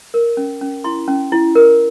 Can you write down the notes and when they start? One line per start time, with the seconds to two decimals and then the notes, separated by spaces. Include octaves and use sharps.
0.14 A#4
0.37 C#4
0.61 C#4
0.84 E4 C6
1.08 C#4
1.32 E4
1.55 A#4